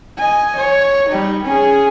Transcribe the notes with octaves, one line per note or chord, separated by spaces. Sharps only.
D#5 G#5
C#5
G3 D#4
C#4 G#4